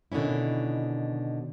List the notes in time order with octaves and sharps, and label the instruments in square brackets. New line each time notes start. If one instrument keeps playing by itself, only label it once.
[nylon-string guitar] B2 D3 D#3 C#4 E4